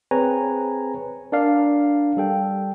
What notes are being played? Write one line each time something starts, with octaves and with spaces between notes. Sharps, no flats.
C4 G#4 B4 C#5 G#5 A#5
D4 A#4 D5 F5
G3 A4 G5